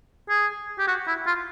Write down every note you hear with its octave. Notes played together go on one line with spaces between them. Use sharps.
G#4
G4
F#4
E4
F4